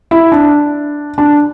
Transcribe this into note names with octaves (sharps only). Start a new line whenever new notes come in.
E4
D4
D4